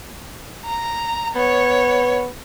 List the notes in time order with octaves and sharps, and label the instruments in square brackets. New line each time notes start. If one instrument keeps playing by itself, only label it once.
[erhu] A#5
[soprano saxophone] B3 [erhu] C#5